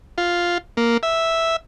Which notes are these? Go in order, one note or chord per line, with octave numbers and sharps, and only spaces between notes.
F4
A#3
E5